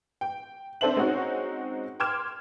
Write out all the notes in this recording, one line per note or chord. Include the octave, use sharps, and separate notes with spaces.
G5
C4 D4 A4 C5 E5 F#7
G#3 C4 C#4 D#4 F#4
G5 C6 D6 F6 G#6 E7